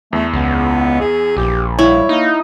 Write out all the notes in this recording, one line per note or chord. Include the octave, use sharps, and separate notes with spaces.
E2 A3
C#2 B3
G#4
A#1 G4
G3 E4 C#5
A#3 D#4